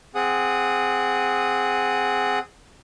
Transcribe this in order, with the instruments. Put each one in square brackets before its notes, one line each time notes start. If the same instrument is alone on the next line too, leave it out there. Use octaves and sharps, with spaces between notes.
[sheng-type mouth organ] C4 G#4 F#5 D#6